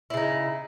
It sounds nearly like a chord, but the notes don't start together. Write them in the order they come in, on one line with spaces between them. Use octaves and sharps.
E4 C#3 D#4